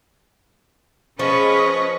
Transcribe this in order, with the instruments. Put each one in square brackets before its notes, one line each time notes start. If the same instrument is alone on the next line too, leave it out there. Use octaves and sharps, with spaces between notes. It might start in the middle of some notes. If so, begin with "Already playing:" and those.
[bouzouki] F3 [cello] C#4 B4 [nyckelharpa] G#4 B5 [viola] D#5 C#6